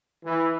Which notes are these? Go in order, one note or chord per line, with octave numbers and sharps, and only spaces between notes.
E3